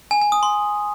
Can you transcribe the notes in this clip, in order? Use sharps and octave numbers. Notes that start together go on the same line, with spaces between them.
G#5
G#5
D#6
C6